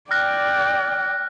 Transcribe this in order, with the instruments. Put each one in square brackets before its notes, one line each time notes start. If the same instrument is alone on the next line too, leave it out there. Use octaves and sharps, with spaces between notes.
[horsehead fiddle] D5 G5 [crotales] F6 F#6 A#6